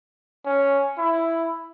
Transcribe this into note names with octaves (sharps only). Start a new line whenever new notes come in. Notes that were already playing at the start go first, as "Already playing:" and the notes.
C#4
E4